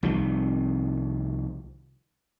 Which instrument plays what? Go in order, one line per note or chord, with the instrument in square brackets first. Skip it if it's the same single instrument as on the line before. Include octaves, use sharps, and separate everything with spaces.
[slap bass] C2 C3 D#3 F3